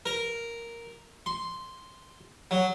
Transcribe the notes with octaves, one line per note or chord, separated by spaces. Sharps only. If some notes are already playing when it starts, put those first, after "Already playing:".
A#4
C6
F#3